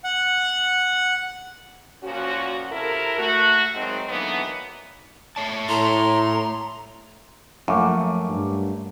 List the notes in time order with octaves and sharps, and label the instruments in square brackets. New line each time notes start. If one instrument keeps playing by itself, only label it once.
[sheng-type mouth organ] F#5
[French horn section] A#2 F3 C#4 F#4
C3 E4 A4 A#4
A3 F#4
D#3 F#3 G#3 C4 D#4
D3 E3 F#3 A#3 B3 D#4
[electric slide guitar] A3 C#5 A5
[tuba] A2 [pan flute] A#5 [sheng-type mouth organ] C6
[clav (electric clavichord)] F#2 [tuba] F3 [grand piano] A3 A#3 [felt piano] F5 C#6 D6
[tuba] G2